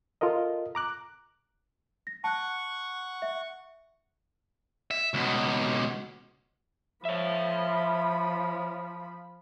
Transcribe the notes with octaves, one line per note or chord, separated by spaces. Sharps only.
F4 A4 A#4 D#5
A#5 D6 F#6
A#6
F#5 A5 C#6 F#6
E5
E5
C#2 B2
F3 C#5 E5 B5